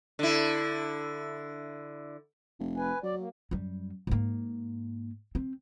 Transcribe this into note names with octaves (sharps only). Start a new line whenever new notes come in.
D3 E4
F1
B4 G#5
D#2 F#3 D5
A#3
F#2 G3
G#2 A#3
C4